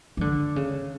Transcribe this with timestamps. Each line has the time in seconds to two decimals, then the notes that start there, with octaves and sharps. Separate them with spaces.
0.17 E3
0.21 D3
0.56 C#3